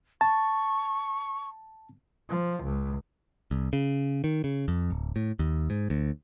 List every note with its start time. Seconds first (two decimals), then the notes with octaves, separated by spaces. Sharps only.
0.21 A5 C#6
2.29 F3
2.64 C#2
3.51 C2
3.73 C#3
4.24 D#3
4.44 C#3
4.68 F2
4.90 D1
5.16 A2
5.39 D#2
5.70 G#2
5.90 D2